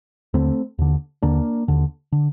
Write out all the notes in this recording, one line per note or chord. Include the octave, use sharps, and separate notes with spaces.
D#2 D3 A3 C4
D#2 D3
D#2 D3 A#3 D4
D#2 D3
D3